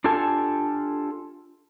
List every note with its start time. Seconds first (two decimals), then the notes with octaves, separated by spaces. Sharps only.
0.04 D4 F4 G4 A4 G#5 A5